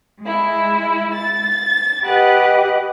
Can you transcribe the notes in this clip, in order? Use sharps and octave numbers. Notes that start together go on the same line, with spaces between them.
G#3 E4
A6
G4 B4 D#5 F#5